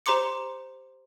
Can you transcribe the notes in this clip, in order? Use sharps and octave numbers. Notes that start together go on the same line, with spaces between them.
G4 C5 A#5 C6 D6 C#7